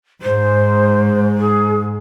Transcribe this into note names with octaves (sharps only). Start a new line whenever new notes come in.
G#2 C5
G#4